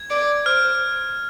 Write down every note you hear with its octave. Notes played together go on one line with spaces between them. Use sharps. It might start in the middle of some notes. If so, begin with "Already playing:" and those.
Already playing: G#6
D5
C5 F6